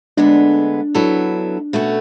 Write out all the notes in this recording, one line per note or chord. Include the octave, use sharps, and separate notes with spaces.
D2 D3 G#3 B3 D4
F#3 B3 E4 A4
B2 A3 C#4 F#4